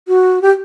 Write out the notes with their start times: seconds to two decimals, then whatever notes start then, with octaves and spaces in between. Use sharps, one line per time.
0.08 F#4
0.42 G4